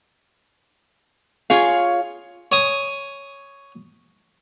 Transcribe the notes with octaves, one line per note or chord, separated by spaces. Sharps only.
F4 G#4 C#5 F5
C#5 G#5 D#6